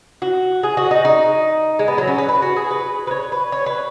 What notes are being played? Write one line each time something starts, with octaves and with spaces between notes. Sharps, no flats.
F#4
G#4
F#4
D#4
D#4
G#3
B3
F#3
C#4
B4
B4
F#4
G#4
B4
B4
C#5
B4
C#5
B4